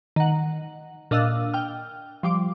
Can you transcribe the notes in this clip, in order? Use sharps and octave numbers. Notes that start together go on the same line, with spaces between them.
D#3 F#5
A#2 D4 D#5 F5 E6 F#6
G5 F6
F3 G3 D6